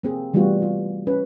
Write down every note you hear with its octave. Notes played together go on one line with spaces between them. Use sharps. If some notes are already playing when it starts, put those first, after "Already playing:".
A#3 C4 G#4
E3 G3 A3 B3 F4 F#4
F4
C#4 B4